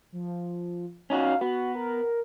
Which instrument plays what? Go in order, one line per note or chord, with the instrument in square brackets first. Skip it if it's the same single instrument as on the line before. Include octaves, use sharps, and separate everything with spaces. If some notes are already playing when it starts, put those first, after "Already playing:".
[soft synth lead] F3
[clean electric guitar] C#4 D#4 F#4 [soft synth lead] F5
[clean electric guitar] B3 [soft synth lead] F#4
[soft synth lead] A#4